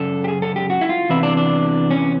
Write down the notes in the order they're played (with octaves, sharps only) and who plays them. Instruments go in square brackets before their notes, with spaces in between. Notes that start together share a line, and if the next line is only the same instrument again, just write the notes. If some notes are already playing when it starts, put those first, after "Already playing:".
Already playing: [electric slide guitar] F#2 C#3 A4
G4
G#4
A4
G4
F#4
E4
F4
E2 C3 E3 E4
D4
D4
C#4